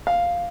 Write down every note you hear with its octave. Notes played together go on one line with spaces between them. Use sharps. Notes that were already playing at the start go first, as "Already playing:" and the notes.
F5